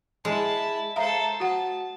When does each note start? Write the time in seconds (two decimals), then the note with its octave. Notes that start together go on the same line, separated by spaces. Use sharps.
0.25 G#3 E4 A5
0.96 A4 C5 E5 F5 A#5
1.40 F#4 F#5 A5